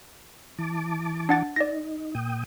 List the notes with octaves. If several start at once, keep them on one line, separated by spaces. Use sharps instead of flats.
E3 A5 D6
D4 F#5 A6
D#4 D5 A#6
A#2 G5 D#6